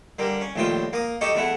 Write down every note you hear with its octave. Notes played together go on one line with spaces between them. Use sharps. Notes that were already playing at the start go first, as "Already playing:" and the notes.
D3 G3 A#3
C#4
A#1 D#2 A2 F4 G5
A#3 D#6
D#4 G4 A4 D#5 C#6
E2 A3 E4 F#5